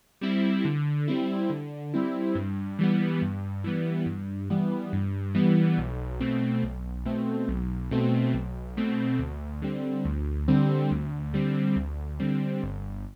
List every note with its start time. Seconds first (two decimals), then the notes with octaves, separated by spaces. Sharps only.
0.21 G3 C4 E4
0.65 D3
1.08 G3 C4 E4
1.50 D3
1.94 G3 C4 E4
2.35 G2
2.79 E3 G3 B3
3.22 G2
3.64 E3 G3 B3
4.06 G2
4.50 E3 G3 B3
4.93 G2
5.34 E3 G3 B3
5.78 B1
6.20 B2 A3 C4
6.63 B1
7.05 B2 A3 C4
7.48 B1
7.91 B2 A3 C4
8.34 B1
8.77 B2 A3 C4
9.19 D2
9.62 D3 G3 C4
10.05 D2
10.48 D3 G3 C4
10.91 D2
11.34 D3 G3 C4
11.76 D2
12.20 D3 G3 C4
12.62 G1